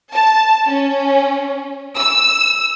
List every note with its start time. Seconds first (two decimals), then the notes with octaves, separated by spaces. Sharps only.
0.13 A5
0.67 C#4
1.98 E6